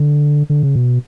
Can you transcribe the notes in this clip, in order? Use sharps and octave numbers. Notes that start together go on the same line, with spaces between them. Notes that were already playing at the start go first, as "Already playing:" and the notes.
Already playing: D3
D3
C#3
B2